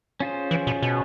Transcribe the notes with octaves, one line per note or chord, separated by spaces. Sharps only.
C#4 F4 G#4 C5
E3
B2
B2